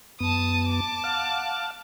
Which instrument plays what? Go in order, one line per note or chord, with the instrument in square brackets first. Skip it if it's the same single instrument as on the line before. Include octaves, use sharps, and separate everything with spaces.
[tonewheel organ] F#2 B3 [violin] A5 D#6
[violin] A5 D6
[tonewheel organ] F5 F#5 F6